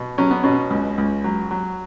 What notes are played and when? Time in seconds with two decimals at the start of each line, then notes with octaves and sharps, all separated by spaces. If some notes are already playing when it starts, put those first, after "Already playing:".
Already playing: B2
0.18 F#3 C#4
0.31 B3
0.44 B2 C#4
0.70 C#2
0.98 C#2
1.24 F#3
1.51 F#3